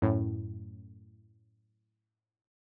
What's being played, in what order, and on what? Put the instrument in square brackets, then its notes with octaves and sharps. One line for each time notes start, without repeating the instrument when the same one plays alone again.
[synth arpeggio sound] F#2 A2